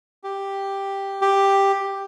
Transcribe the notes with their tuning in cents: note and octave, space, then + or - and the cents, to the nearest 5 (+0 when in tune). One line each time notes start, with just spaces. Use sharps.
G4 +0
G4 +5